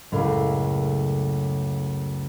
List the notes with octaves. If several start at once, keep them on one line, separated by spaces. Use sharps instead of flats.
C#2 F#2 A2 A4 A#4 F5